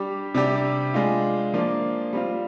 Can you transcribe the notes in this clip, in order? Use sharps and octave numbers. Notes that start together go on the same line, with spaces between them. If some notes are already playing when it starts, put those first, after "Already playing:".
Already playing: G3 D4 G4
C3 G3 D4 G4
G#3 D4 F4
F3 A#3 D4 F4
G3 C4 F4